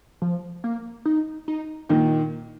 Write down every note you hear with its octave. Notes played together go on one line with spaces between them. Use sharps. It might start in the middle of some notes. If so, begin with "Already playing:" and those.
F3
A#3
D#4
D#4
A#2 D#3 D#4